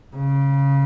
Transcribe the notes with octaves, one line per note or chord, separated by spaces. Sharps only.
C#3